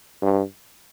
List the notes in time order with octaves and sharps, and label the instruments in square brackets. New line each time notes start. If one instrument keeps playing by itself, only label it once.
[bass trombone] G2